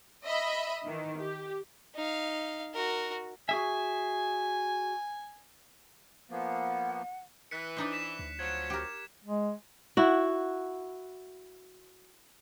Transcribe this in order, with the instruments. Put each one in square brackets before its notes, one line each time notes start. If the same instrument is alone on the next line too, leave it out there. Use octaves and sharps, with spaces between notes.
[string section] D#5 E5 B5
D#3 E3
G4
[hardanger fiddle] D#4 F5
F#4 A#4
[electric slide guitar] F#4 G#4 E5 [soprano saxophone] G#5
[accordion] F3 A#3 B3 [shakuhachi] F#5
[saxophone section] E3 [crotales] F#6 B6 C#7
[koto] D4 D#4 C5
[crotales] B6 E7
[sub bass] D2
[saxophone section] F3 F#3 [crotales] G#6 E7
[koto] G4 A#4
[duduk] G#3
[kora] E4 F#4